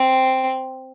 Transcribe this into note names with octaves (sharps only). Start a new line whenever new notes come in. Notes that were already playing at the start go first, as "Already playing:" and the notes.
Already playing: C4